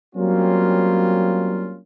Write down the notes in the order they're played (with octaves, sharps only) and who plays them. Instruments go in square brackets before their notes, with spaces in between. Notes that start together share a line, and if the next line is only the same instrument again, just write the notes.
[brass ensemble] F#3 G3 A#3 C4 C#4 F4